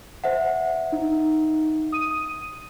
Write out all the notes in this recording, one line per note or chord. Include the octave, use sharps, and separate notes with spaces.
C5 E5 F#5
D#4
D#6 D#7